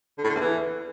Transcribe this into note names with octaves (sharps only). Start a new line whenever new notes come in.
D3
A2
D3
E2
E3